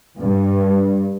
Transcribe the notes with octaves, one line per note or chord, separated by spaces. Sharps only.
G2